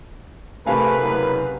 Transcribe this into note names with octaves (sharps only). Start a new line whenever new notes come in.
C3 A3 A#4 B4 F5 G#5
F#1